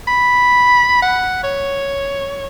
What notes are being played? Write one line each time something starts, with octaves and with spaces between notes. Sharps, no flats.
B5
F#5
C#5